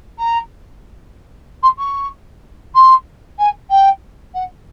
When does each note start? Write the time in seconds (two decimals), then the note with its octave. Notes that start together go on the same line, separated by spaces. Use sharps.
0.18 A#5
1.62 C6
1.78 C#6
2.75 C6
3.38 G#5
3.70 G5
4.34 F#5